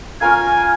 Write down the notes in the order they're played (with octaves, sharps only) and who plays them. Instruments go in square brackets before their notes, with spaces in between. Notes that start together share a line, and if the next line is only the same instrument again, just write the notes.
[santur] C#4 F4 A#4 F5 [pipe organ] G#5